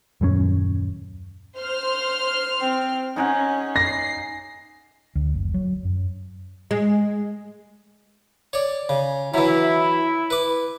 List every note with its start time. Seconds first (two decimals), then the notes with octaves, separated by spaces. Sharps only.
0.21 D#1 F#2 G3 C#4
1.58 C5 C6 F6
2.61 C4
3.16 C#4 D#4 G#4 F#5
3.76 A#6 C7
5.15 D2
5.34 F#1
5.54 F#3
5.85 F#2
6.71 G#3
8.53 C#5 D5
8.89 C#3
9.34 E3 F#3 E4
10.30 B4 D6